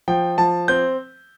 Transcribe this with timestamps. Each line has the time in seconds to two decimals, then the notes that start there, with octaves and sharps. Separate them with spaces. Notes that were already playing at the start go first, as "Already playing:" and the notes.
0.08 F3 G5
0.38 F3 A5
0.68 C4 G6